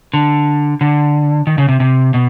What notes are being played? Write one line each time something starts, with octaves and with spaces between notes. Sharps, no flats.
D3
D3
D#3
C#3
C3
C3
B2